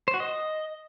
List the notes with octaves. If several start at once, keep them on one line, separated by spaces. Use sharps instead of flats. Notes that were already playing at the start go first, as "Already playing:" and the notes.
C5
F#4
D#5